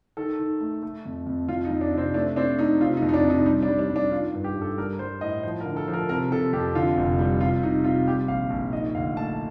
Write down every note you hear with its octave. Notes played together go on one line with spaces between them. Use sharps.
D#3 A4
D#3
A3
A3
F2
F2
F2 F4
D#4
F2
D4
C3 C4
A3 D4
C4 D4
A3 D#4
C3 F4
D#4
F2
D#4
D4
C3
D#4
G3 D#4
D4
G3
D4
G3
D4
D#3 F4
G2
G4
G2
A4
G3 A#4
G3 C5
A2 D#5
F3 C5
A#4
D3
A4
F3
A#4
C3 A#4
C3 A4
F2 G4
D3 F4
F1
G3
C3 F4
C3 D#4
C3 F4
G3 G4
A#1 F5
A#1
D#3 D#5
D2 F5
A3 A5